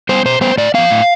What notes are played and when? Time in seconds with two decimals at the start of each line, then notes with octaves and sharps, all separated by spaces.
0.09 G3 B3 C5
0.25 B2 C5
0.41 G3 B3 C5
0.58 A2 D5
0.74 F3 B3 F5
0.91 A2